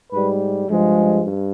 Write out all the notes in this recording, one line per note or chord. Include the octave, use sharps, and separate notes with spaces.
G#2 G3 B4
G2 F3 G#3
G2